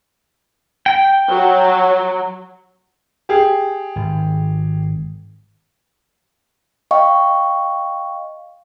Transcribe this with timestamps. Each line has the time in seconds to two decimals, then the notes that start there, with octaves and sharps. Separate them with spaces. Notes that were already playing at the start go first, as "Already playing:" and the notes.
0.86 G5
1.29 F#3
3.29 G4 G#4
3.96 G#1
6.91 D#5 F5 G5 C#6